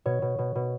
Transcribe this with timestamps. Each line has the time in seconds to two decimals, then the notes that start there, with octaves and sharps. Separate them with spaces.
0.06 B2 C#5
0.22 B2
0.39 B2
0.55 B2